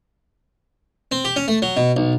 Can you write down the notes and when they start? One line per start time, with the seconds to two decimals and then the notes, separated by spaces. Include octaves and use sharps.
1.12 C4
1.25 G4
1.36 C#4
1.48 A3
1.62 F#3
1.77 B2
1.97 B1